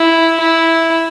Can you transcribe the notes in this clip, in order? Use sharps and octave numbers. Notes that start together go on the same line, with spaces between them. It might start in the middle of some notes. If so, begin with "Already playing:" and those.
Already playing: E4
E4